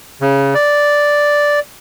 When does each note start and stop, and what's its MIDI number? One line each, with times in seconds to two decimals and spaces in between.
0.21 0.54 49
0.55 1.60 74